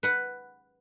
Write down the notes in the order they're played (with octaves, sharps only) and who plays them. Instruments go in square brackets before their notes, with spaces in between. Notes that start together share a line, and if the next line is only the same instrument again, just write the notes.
[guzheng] B4 F#5